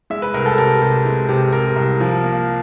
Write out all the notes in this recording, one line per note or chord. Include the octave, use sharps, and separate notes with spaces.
G#3 E5
B4
C2 A#4
A4
C3 A#4
C3
G#3
C3
C3 A#4
C2
F3
A#3